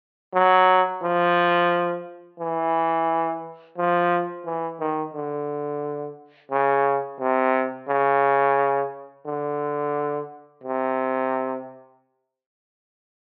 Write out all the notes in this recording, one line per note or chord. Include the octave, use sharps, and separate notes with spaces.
F#3
F3
E3
F3
E3
D#3
D3
C#3
C3
C#3
D3
C3